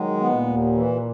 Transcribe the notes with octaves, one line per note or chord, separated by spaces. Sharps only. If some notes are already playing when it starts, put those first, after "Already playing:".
Already playing: D#3 F#3 G#3
B3
A#2
D#2
E3